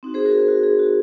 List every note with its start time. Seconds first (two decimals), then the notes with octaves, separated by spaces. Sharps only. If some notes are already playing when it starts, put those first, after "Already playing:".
0.03 C4 D#4 F#4
0.14 G#4 C5
0.25 F#4 A#4
0.38 G#4
0.48 F#4
0.63 G#4
0.79 F#4